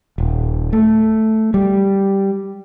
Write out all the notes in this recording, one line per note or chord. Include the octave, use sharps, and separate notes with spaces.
D#1
A3
G3